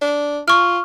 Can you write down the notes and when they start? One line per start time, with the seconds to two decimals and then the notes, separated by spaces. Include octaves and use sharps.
0.02 D4
0.48 F4 C#6 F6